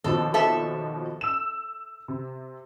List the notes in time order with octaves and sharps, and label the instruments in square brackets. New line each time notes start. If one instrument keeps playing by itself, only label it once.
[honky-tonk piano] D#2 B2 F3 [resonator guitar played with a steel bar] A4
[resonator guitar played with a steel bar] A4 E5
[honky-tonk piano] E6 E7
C3